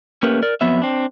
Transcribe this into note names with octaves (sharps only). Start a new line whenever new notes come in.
A3 A#3 C#4 G4 A#4 B4
A#4 D5
F2 F#3 B3 B4 E5
C4 D4